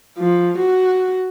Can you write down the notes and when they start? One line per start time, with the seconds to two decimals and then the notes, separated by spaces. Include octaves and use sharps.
0.18 F3
0.58 F#4